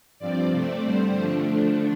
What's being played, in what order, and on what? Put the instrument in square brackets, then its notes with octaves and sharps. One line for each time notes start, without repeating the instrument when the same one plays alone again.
[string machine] G2 F3 C4 D5
C3 A3 C4 D5
G2 D3 G3 C4 C5
D3 F3 A3 D4